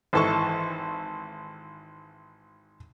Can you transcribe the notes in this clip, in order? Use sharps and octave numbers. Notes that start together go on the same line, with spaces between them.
G#1 E3 A4 A5 C#6